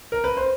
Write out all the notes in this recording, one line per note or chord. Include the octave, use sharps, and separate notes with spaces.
A#4
B4
C5